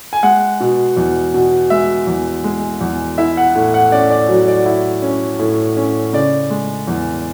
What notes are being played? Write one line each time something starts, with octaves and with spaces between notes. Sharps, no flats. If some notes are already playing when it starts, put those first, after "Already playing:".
G#5
G#3 F#5
B2
E2
B2
G#3 E5
E2
G#3
E2
E4 E5
F#5
A2
F#5
C#4 D5
D5
F#3
D5
E4
C#4
A2
C#4
C#3 D5
G#3
E2